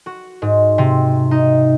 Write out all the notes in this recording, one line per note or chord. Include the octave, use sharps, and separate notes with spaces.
F#4
G#2
C3
D#4